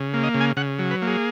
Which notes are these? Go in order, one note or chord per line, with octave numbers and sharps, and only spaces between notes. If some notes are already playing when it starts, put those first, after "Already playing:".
Already playing: C#3
A#3
D#5
C#3
G#5
C#3 F#5
F#3
B4
A#3
G#4